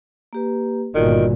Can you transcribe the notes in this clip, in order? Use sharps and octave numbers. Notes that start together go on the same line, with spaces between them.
A#3 G4 B4
G1 A#2 D#3 F4 F#4 D5